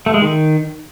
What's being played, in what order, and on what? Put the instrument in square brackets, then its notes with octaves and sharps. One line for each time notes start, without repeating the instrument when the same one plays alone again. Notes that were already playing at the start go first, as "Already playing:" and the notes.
[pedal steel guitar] A3
G#3
D#3